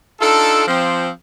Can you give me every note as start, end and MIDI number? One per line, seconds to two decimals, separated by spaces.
0.21 0.66 62
0.21 0.66 63
0.21 0.66 65
0.21 0.66 69
0.67 1.09 53
0.67 1.09 60